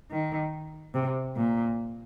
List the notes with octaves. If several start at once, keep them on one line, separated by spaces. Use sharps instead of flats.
D#3
C3
A#2